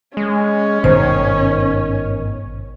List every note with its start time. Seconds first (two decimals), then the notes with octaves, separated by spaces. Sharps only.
0.17 G#3 C#4
0.84 G#1 G2 B2 D#3 C5